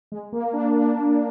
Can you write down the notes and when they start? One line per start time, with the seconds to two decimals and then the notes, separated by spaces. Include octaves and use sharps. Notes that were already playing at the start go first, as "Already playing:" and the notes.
0.12 G#3
0.33 A#3
0.53 D4
0.75 D4